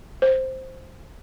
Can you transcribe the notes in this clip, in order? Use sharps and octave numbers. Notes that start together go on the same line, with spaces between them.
C5